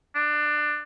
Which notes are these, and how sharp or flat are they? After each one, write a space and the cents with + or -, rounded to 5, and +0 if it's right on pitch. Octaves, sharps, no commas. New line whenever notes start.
D4 +20